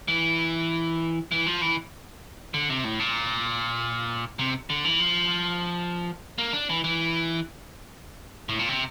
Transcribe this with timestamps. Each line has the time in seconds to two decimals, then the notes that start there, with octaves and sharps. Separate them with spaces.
0.08 E3
1.32 E3
1.46 F3
1.61 E3
2.54 D3
2.69 C3
2.84 A2
3.00 A#2
4.39 C3
4.70 D3
4.85 E3
5.00 F3
6.38 A#3
6.53 D4
6.69 E3
6.84 E3
8.49 A2
8.59 A#2
8.69 C3